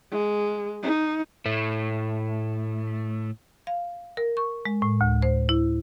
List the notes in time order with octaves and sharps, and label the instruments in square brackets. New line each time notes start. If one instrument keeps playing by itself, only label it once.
[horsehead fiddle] G#3
D#4
[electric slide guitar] A2 A3
[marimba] F5
A#4
C#6
G#3
A2
D2
C5
E4